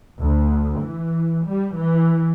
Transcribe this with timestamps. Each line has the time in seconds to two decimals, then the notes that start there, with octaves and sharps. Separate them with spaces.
0.20 D2
0.82 E3
1.47 G3
1.78 E3